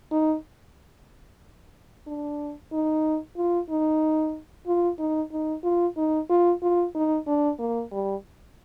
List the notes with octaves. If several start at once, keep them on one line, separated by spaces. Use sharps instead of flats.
D#4
D4
D#4
F4
D#4
F4
D#4
D#4
F4
D#4
F4
F4
D#4
D4
A#3
G3